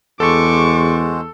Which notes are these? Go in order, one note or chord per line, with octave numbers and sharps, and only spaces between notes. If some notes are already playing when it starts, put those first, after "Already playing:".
E2 G#3 F#4 A4 C5 C#6 D6